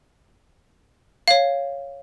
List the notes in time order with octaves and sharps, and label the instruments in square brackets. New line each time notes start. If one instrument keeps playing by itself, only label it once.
[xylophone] C#5 F5